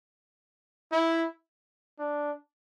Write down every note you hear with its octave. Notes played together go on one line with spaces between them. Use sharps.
E4
D4